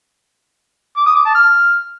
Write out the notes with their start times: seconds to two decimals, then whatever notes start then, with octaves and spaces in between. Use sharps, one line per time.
0.97 D6
1.06 D#6
1.16 D6
1.25 A5
1.35 F6